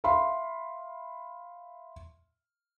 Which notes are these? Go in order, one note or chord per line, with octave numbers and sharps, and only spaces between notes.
E5 F5 B5 C6